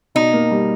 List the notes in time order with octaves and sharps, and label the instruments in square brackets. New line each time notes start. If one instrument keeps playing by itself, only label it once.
[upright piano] B2 [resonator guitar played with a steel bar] D#4
[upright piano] A#3
G3